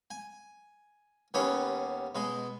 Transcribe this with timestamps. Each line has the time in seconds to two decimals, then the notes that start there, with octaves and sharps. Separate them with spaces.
0.10 G#5
1.34 D#2 G3 B3 C#4 G#4 C#5
2.15 B2 G#3 G#4